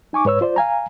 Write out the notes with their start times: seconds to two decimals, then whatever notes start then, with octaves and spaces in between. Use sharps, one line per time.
0.13 D#4 G#5 C#6 D6
0.25 G#2 B4 C#5 E6
0.41 F4 C5 D5
0.56 F5 G#5 A#5